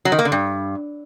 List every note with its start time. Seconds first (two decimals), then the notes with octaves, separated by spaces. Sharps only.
0.05 F#3
0.12 D#3
0.19 A#3
0.25 D3
0.32 G2